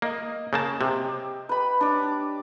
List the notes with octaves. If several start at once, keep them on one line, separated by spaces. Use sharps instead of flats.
A#3 D#5
C#3 A#3 A5
C3 G4
B4 B5
D4 C#5 D6